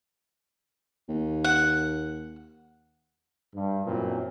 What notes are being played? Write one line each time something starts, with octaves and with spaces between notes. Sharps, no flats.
D#2
F#5
G2
F#2 A#2 E3 C4